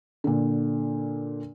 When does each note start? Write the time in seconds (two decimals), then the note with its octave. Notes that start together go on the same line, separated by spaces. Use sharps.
0.24 A#2 D3